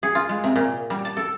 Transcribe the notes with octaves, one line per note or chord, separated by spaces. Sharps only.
G#4
F4
G#3
C3
A#2
G3
A5
A4